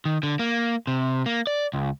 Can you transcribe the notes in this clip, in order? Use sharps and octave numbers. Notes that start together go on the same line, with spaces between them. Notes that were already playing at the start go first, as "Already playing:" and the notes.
D#3
D3
A#3
C3
A#3
D5
C#2